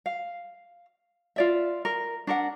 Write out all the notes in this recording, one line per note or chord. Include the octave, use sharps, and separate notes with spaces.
F5
F4 D5 E5
A#4
D4 A#4 F#5